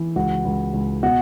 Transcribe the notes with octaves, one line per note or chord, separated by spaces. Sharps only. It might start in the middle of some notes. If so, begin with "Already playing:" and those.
Already playing: E3
C#2 F#4
C#2
C#2
B2 F#4